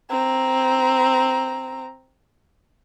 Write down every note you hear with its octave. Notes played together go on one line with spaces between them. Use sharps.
C4 A#5